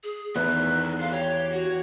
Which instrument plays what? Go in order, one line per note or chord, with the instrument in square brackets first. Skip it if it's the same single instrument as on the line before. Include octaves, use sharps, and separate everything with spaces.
[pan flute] G#4
[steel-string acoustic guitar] E2 [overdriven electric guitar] D#3 B3 [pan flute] F#6
[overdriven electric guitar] A4 C5 [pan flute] F5
[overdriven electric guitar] G4 [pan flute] C#5
[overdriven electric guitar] F#4